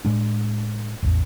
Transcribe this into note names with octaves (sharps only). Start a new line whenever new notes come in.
A2 G#3 D4
D1 A1 E2